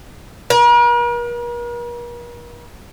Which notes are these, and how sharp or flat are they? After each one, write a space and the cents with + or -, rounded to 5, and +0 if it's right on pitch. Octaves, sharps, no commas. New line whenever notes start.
A#4 +45